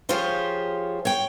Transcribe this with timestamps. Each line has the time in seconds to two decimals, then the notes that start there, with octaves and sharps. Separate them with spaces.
0.09 F3 F4 G4 G#4 C5 C#5
1.05 C#5 G5